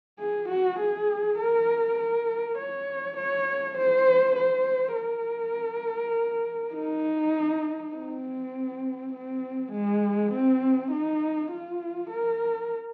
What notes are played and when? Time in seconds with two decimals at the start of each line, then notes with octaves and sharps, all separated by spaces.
0.19 G#4
0.49 F#4
0.79 G#4
1.38 A#4
1.99 A#4
2.58 C#5
3.18 C#5
3.78 C5
4.36 C5
4.96 A#4
6.75 D#4
7.94 C4
9.13 C4
9.72 G#3
10.32 C4
10.91 D#4
11.51 F4
12.11 A#4